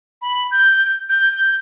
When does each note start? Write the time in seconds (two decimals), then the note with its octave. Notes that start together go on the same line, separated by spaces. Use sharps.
0.22 B5
0.51 G6
1.09 G6